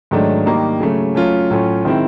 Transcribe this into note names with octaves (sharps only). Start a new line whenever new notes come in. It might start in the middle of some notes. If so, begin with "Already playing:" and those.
G#2 D#3 F#3 A3 D4
D#3 G3 A#3 D#4 G4
C#3 F#3 A3
F#3 A3 C#4 F4
A2 F#3 A3 C#4 F4
D#3 G#3 C4 E4